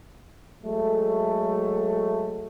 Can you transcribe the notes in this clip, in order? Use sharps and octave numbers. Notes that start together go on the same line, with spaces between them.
F#3 G#3 A3